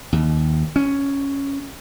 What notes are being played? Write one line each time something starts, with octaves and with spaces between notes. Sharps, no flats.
D#2
C#4